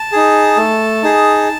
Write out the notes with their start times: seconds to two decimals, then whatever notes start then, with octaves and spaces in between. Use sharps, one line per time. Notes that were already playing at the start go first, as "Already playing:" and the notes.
Already playing: A5
0.12 D#4 G#4
0.57 A3
1.03 D#4 G#4